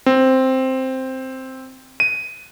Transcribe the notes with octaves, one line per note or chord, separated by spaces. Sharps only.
C4
D#7